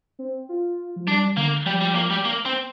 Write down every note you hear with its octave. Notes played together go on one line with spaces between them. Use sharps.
C4
F4
F3
G3 D4
D3 A#3
F3 G3
G3
A#3
G3
A#3
C4